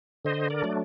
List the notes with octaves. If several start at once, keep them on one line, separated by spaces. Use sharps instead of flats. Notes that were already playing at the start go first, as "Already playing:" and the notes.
D3 C5 D#5
A#4 D5
F#3 A3 D4